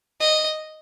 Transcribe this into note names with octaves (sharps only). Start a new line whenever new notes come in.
D#5